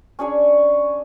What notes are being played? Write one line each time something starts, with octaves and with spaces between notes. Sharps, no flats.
C#4 D4 G#4 C#5